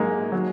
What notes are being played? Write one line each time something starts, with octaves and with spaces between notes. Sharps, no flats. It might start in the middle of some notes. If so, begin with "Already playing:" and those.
Already playing: G#2 F#3 G#3 A#3 D#4
F#3